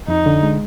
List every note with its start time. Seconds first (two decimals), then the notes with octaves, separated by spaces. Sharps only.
0.08 F2 D#4
0.26 D3
0.43 G#3